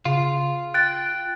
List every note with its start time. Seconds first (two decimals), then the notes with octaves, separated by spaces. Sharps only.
0.05 C#3 F4
0.74 G5 F#6 A6